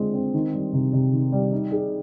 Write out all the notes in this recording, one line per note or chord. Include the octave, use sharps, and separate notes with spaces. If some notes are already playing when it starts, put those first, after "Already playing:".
Already playing: D3 G#3 C4 F4
C4
D#3
G3
C3
C3
D#3
G3
D#4
G#4